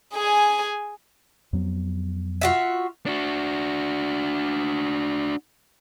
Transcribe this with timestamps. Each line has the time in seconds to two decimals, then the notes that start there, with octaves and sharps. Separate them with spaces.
0.14 G#4 G#5
1.53 F2 F#3 B3
2.41 F4 F#4 E5
3.06 D4 F#4